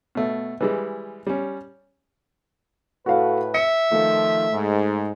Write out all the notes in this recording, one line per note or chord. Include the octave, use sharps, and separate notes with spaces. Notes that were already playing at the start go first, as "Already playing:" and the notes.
B2 A3
E3 G3 G#3
G3 C#4
A2 F#4 A4 B4 F5
E5 C#7
D#3 F3 A3
G#2